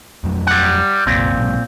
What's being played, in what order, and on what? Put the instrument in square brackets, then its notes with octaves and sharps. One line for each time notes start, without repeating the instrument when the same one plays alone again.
[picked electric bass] F2 F#3 A3
[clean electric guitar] G3 F#5
[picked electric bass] F#1 B1 [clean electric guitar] A#2 C4
[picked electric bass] B1 G#2